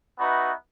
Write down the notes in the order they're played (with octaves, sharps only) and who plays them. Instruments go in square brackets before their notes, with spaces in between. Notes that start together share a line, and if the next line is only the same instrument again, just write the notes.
[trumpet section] B3 D#4 F#4 B4 E5